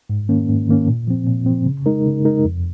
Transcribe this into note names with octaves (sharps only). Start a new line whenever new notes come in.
G#2
D#3 A#3 C#4
G#2
D#3 A#3 C#4
A#2
F3 C4
A#2
F3 C4
C#3
G#3 D#4 A#4
C#3
G#3 D#4 A#4
F2